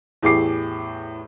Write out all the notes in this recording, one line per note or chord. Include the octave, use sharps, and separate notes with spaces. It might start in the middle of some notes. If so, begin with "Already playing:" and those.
E2 A2 G4 G#4 D6 C7